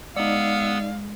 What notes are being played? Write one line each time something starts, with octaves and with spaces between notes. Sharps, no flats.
G#3 B3 D#4 D5 F5 F#5 E6